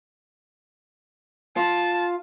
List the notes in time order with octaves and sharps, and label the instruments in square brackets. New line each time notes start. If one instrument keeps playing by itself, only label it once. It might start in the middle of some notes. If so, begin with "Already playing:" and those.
[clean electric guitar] F4 [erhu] A5